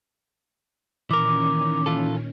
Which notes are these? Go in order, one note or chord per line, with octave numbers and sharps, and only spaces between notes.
A#2 D#3 E3 C#4 A#4 D6
E3 F4 A4